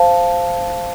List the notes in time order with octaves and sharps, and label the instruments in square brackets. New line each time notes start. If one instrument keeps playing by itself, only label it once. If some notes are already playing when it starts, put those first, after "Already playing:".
Already playing: [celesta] C5 F5 A5